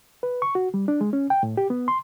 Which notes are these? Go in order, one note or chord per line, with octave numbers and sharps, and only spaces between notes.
B4
C#6
F#4
G3
D4
G#3
C#4
G5
A2
G4
B3
C6